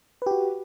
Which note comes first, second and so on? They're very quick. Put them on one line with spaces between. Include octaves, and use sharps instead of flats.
B4 G4 F#4